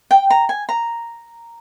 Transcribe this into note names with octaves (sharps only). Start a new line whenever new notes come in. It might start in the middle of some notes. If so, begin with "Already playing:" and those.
G5
A#5
G#5
A#5